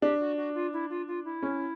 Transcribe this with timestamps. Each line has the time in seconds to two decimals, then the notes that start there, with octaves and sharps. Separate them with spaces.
0.01 D4 G4
0.19 F#4
0.36 F#4
0.54 F4
0.73 E4
0.89 F4
1.07 F4
1.24 E4
1.43 C#4